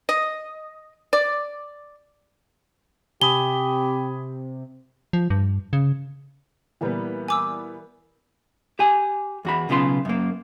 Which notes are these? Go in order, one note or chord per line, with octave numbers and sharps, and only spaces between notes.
D#5
D5
C3 G4 G#5 B5 D#6 G7
F3
G2
C#3
A#2 E3 G3 A#3 B3 B4
G#5 D6 E6
G4 G#5
E2 F#4 B5
B1 C#3 B3 F4 C6
F#2 A#3